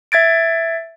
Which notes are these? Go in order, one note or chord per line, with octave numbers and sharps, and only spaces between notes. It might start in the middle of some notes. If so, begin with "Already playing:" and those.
E5 G#6 A6 D7